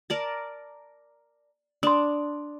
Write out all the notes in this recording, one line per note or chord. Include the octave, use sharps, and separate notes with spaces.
A#4 D5 A5
D4 C6 D#6